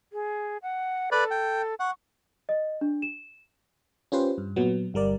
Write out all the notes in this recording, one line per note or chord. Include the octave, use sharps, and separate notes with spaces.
G#4
F#5
A4 B4 D5
G5
F#5 C#6
D#5
D4
E7
C#4 F4 G4 B4 C5
G2
A#2 F#3 B3
G1 G3 A#4 D5